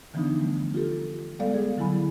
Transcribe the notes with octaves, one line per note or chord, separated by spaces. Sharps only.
D3 E3 F3 B3 D4 D#4
G3 A3
F4 G4 A4
G3 G#3 B3 A4 D5 F5
G#4
D3 F#3 E4 G#5 B5